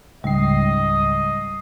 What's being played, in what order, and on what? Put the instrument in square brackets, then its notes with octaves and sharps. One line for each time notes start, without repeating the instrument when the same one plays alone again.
[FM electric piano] C#2 G#2 C7 [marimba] G3 G5 [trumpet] D#5